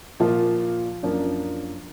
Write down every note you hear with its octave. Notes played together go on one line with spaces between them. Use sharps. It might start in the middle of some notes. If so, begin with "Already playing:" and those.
A#2 F3 A#3 F4
F#2 F3 A#3 D4